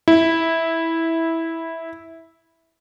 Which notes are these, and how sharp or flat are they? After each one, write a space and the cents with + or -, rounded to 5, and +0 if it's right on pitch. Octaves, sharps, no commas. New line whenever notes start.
E4 -10